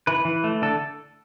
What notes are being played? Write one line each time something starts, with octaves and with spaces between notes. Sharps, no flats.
E3 B4
E3
A3
D3 A4